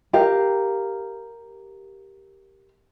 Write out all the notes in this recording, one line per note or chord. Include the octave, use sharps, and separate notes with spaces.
G4 A#4 F5